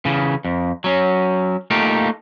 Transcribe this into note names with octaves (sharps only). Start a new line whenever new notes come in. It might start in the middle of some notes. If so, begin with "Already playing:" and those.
C#3 E3
F2
F#3 C#4
A3 A#3 D#4 F4 G4